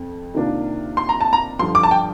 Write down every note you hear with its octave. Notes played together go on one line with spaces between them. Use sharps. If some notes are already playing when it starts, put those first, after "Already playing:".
Already playing: F2
C3 D#3 A#3 D4 F4
C6
A#5
A5
A#5
G2 D3 F3 C6
D6
A5
G5